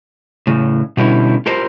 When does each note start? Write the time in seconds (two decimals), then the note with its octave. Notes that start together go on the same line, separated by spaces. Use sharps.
0.47 A2 C#3
0.97 B2 D3 G3 B3 C#4 E4
1.46 F4 G4 A#4 C5